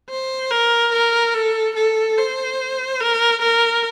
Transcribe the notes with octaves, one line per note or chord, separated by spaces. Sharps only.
C5
A#4
A#4
A4
A4
C5
A#4
A#4